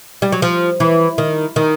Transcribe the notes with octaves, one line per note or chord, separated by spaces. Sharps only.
G3
F#3
F3
E3
D#3
D#3